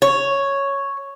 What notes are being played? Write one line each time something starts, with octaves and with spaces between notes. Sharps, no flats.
C#5